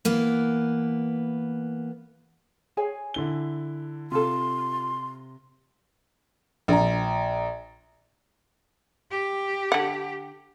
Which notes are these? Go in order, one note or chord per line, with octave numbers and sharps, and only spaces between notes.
E3 A#3 B3
G#4 C#5 G#5
D3 E4 G7
C3 F4 A4 C6
A#1 A#5
G4
D3 F#5